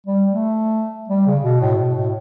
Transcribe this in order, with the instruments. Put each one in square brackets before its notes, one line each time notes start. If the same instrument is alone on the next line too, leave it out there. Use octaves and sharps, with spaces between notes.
[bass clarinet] G3
A3
G3
C#3
B2
A2
B2
A2